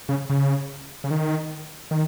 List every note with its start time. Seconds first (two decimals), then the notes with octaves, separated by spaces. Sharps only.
0.09 C#3
0.30 C#3
1.04 C#3
1.11 D#3
1.91 D#3